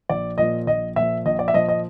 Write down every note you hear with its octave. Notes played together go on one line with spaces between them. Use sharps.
A#1 D5
A#2 F3 D#5
A#1 D#5
A#2 F3 E5
A#1 D#5
D5
E5
A#2 F3 D#5
D#5